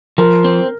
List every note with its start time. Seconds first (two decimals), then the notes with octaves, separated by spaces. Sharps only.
0.18 F3 A#4
0.44 C4